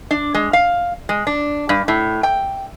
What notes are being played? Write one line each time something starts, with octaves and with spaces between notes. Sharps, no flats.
D4
G#3
F5
G#3
D4
G2
A2
G5